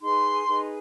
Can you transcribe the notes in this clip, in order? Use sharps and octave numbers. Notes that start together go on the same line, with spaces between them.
D#4 G#4 B4 C6
D#4 G#4 B4